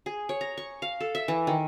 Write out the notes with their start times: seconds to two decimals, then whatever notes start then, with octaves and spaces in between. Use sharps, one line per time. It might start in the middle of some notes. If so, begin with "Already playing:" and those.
0.06 G#4
0.29 C#5
0.41 A#5
0.57 C#6
0.82 F5
1.00 A4
1.15 E5
1.28 E3
1.47 D#3